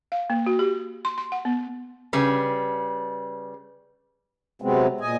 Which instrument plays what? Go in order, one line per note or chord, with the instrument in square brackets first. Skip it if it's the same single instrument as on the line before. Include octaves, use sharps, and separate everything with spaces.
[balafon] F5
A#3
F#4
G4
C6
C6
F#5
B3
[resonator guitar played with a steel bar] C#3 G3 B4
[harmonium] C3 F#3 G#3 B3 C4
A#2 D#5 G#5